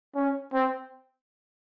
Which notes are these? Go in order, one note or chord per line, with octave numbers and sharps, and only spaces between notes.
C#4
C4